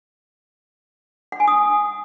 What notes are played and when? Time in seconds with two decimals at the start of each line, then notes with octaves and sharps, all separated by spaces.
1.32 F#5
1.40 G#5
1.48 D#6